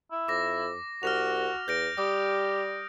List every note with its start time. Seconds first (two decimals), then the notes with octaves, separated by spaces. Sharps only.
0.11 E4
0.28 F2 D6 A#6
1.03 C2 F#4 F6 A#6 F7
1.68 E2 G6 A#6 D7
1.98 G3 G4 D#6